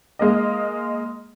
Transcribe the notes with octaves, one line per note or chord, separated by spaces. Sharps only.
G#3 A#3 D#5